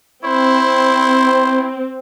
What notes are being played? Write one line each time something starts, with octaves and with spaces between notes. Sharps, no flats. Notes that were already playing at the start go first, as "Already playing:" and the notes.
C4 E4 C5